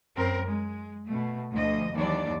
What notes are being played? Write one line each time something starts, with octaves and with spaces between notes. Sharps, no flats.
F#2 C4 A#4
G#3
B2 A3
D2 F3 D#5
D#2 E3 F#3 D4 D5